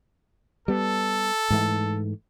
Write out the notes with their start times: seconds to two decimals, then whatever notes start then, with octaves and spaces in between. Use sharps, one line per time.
0.68 G3 B3 A4
1.50 G#2 E3 A3